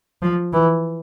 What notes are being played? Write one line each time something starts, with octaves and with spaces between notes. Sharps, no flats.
F3
E3